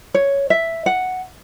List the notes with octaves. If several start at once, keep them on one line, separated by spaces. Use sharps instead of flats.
C#5
E5
F#5